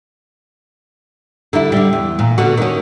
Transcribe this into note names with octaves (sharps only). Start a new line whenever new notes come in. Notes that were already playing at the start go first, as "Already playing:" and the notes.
D3 G3 E4
D3 G3
E2
A#2
B2 D3 F#4
D#3 C#4